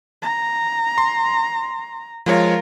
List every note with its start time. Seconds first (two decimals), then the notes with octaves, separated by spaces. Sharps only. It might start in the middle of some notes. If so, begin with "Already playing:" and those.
0.22 A#5
0.98 C6
2.26 F3 G#3 F4 A#4 C#5